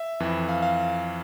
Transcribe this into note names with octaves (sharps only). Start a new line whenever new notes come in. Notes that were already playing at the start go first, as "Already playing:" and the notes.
Already playing: E5
F2 E3
F5
F5